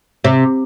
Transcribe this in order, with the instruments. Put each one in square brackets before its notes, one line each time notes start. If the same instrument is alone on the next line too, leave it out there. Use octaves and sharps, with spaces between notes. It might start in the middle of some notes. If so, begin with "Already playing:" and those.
[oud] C3